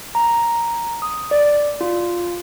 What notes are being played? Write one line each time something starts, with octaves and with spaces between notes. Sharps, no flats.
A#5
D#6
D5
F4